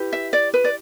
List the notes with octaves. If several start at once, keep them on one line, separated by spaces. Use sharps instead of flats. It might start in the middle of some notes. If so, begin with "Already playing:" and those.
Already playing: E4 G4 B4
E5
D5
B4
D5